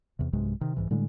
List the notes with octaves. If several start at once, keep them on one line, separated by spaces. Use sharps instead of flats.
E2 C3
B1 G2 C3 G#3
C3 D#3
C2 G#2 E3
A2 D3 G3 G#3